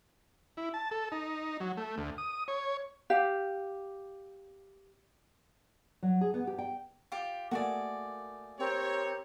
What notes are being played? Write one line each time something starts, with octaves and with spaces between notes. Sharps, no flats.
E4
A5
A4
D#4
F#3
A3
D2
D#6
C#5
G4 F5
F#3
G#4
B3
G4
G5
F4 G4
A3 A#3 F#4 G#4 D5
C4 G4 A#4 C#5